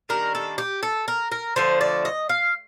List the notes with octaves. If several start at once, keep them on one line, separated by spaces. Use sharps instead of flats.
D#3 G3 A#3 D4 A#4
A4
G4
A4
A#4
A#4
D3 F3 A3 C5
D5
D#5
F5